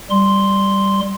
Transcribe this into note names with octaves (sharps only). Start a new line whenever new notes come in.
G3 C6